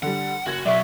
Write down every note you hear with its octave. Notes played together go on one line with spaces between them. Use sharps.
D3 G3 F#5
F#1 F#4 G#6 F#7
B1 F#3 D5 E5 C#6